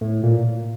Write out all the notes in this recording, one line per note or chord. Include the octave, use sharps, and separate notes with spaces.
A2
A#2